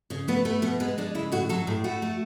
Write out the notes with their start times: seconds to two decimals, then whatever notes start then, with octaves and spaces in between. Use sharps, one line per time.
0.10 C#3 C#4
0.28 A3 B3
0.45 A3 B3
0.62 B2 B3
0.80 G#3 B3
0.98 G#3 D4
1.15 C#3 E4
1.32 A2 F#4
1.49 F#3 A4
1.67 A2 G#4
1.84 A3 F#4
2.02 A3